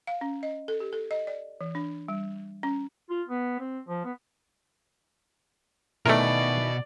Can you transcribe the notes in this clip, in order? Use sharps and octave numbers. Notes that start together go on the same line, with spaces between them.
F5
C#4
D#5
A4
G4
A4
D#5
D5
E3
D4
G3
C#4
F4
B3
C4
F3
B3
B2 D#3 E3 A3 A#4 D5